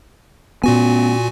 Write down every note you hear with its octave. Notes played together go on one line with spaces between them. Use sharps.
A#2 B3 C#4 F#4 G#5